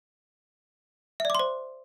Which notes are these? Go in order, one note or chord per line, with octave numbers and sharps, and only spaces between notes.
C5 D5 E5 C6 D6